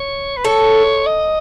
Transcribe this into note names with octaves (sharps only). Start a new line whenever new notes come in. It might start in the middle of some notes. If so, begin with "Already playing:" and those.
Already playing: C#5
B4
A4 C#5
D#5